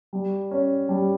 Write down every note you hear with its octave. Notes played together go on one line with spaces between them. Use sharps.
G3
C#4
G3